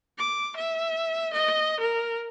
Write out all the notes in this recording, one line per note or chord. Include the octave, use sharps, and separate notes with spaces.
D6
E5
D#5
A#4